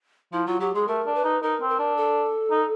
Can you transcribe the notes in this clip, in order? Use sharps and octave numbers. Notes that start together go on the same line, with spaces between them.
F3 E4
F#3 F4
F#3 G4
G#3 G#4
A3 A#4
D4
B4
D#4
D#4 A#4
C4
A#4
D4
A4
D#4